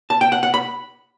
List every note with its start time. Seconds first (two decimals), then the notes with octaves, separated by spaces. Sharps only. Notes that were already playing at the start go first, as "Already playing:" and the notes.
0.10 A5
0.21 G5
0.32 F#5
0.43 F#5
0.54 B5